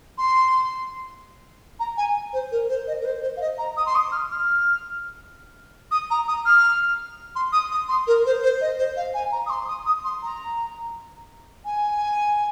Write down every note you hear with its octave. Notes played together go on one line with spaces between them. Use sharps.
C6
A#5
G#5
C5
A#4
C5
D#5
A#4
C5
C5
F5
D#5
A#5
D#6
C6
D#6
F6
F6
D#6
A#5
D#6
F6
C6
D#6
D#6
C6
A#4
C5
C5
D#5
C5
F5
G#5
A#5
D#6
C6
D#6
D#6
C6
A#5
G#5